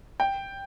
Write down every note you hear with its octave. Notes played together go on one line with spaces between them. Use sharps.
G5